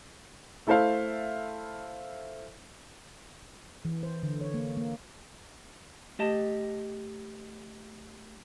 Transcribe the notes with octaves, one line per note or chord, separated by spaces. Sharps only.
A3 E4 A4 C5 E5 F5
E3
C5
D3
C#5
A#3
A#3
A3 G4 D#5 A5